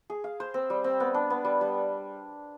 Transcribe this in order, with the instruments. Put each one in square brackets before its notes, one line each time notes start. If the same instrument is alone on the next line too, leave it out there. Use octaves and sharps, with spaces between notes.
[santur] G#4
F5
C5
C4
G3
C4
B3
D4
B3
G3
G3